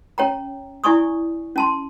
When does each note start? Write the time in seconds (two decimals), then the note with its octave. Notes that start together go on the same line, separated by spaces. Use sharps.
0.18 C#4 C#5 G5 A#5
0.84 E4 D5 G#5 C#6 D#6
1.56 C#4 A5 C6